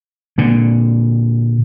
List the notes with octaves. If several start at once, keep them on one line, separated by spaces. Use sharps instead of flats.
A#2 D3